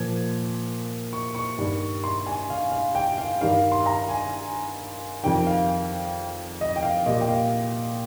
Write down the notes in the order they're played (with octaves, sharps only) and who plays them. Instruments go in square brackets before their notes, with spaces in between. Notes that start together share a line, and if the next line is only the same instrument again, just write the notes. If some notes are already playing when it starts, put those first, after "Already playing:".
Already playing: [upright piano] A#2 F3 G#6
C#6
C#6
G2 D#3 G3
C6
G#5
F5
F5
G5
F5
G2 D#3 G3 F5
C6
A#5
G#5
F2 D#3 G3 G5
F5
D#5
G5
F5
A#2 G3 D#5
G5
F5